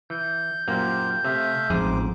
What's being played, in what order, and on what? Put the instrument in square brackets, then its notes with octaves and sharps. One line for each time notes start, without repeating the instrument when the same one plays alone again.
[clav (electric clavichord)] E3 [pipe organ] G6
[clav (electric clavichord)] F#2 A#2 A#3 [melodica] G4 C5 F5
[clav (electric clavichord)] C3 [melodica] A3 E5 F5
[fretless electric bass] A1 F2 [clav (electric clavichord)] G#2 G#4 [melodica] C5 D6